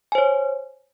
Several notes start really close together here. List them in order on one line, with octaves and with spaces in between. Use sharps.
G#5 C5 C#5